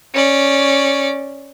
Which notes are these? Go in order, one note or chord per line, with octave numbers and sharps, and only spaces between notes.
C#4 D5